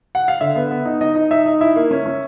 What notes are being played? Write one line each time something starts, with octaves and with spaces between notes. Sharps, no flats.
F#5
F5
D3 E5
B3
B3
D#4
D#4 D#5
D#4
D#4 E5
D#4
E4 E5
A#3
C#4
C#4